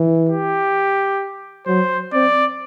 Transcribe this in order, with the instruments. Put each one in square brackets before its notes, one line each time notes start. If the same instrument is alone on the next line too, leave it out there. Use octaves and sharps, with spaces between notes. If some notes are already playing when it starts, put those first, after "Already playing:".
Already playing: [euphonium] E3
[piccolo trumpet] G4
[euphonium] F#3 [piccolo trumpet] C5
[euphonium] C4 [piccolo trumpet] D5